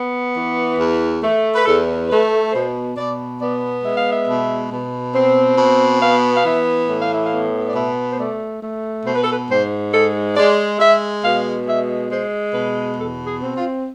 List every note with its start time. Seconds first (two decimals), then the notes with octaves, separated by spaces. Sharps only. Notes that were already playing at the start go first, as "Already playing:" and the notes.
Already playing: B3
0.35 E3
0.78 E2
1.23 A3
1.55 B4
1.66 E2 A4
2.09 A3 B4
2.53 B2 C5
2.97 B2 D5
3.39 B3 D5
3.83 G#3 E5
3.97 F5
4.10 E5
4.27 B2
4.71 B2
5.14 C4
5.57 B2
6.01 B3 F5
6.36 F5
6.44 E3 E5
6.88 A2
7.01 F5
7.13 E5
7.25 F5
7.31 B3
7.67 D5
7.75 B2 E5
8.11 C5
8.18 A3 D5
8.62 A3
9.05 B2 C5
9.15 B4
9.24 A4
9.33 B4
9.49 G#2 C5
9.92 G#3 A4
10.36 G#3 D5
10.79 G#3 E5
11.23 B2 F5
11.66 G#3 E5
12.10 G#3 C5
12.53 B2 B4
12.97 E2 A4
13.26 G#4
13.41 C4
13.55 F4